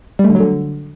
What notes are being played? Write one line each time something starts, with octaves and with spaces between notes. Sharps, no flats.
G3
A3
D3
F#3
D3